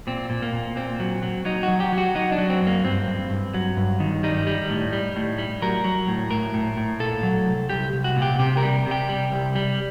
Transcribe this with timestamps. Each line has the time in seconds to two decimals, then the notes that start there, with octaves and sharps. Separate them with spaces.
0.07 A#2 C4
0.30 A#2
0.42 A#3
0.53 A#2
0.76 A#2 C4
1.00 F#3
1.23 F#3
1.45 F#3 D#4
1.63 F#4
1.68 F#3
1.80 G4
1.93 F#3
1.98 F#4
2.15 F#3 D#4
2.32 D4
2.38 F#3
2.49 C4
2.61 F#2
2.67 A#3
2.84 G2 C4
3.07 G2
3.30 G2
3.54 F#3
3.77 G2
4.00 D#3
4.23 G3 D#4
4.47 G3
4.70 A2
4.93 G3
5.16 A2
5.38 G3
5.62 F#3 A#4
5.84 F#3
6.08 A2
6.31 A2 A#4
6.54 A2
6.77 A2
7.00 A#2 A4
7.23 F#3
7.47 C2
7.69 C2 G4
7.93 C2
8.04 F#4
8.16 A#2
8.22 G4
8.39 C3 G4
8.57 A#4
8.63 G3
8.86 C3
8.91 G4
9.09 G3
9.32 C2
9.55 G3